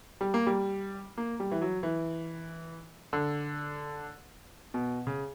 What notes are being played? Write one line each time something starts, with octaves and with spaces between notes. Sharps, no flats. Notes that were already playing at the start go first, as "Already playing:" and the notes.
G3
A#3
G3
A#3
G3
E3
F#3
E3
D3
B2
C#3